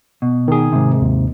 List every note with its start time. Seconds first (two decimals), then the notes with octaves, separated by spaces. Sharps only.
0.22 B2
0.48 D#3 G#4
0.72 G#2 C3
1.01 D#2